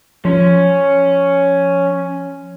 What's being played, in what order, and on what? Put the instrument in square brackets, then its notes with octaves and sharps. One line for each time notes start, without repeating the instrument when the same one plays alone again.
[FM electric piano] F3 [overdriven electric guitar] C#4